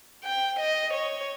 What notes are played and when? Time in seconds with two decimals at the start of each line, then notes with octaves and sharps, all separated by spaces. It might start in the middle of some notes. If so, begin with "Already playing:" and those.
0.24 G5
0.59 D#5
0.93 C#5